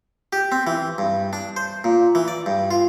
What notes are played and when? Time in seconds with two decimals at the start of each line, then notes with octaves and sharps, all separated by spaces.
0.33 G4
0.52 C4
0.67 E3
0.98 G2
1.33 D4
1.56 C5
1.84 A#2
2.15 E3
2.28 D5
2.46 G2
2.71 F4